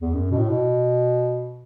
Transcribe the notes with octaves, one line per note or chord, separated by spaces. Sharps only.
E2
F#2
B2
A2
B2